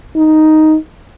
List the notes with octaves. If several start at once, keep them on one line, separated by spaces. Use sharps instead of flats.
D#4